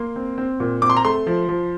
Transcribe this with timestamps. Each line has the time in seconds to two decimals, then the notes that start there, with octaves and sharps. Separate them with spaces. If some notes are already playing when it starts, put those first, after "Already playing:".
Already playing: A#3 C6
0.16 C4
0.38 C4
0.60 A#2
0.82 C4 D6
0.90 C6
0.97 A#5
1.05 A3 C6
1.27 F3
1.49 F3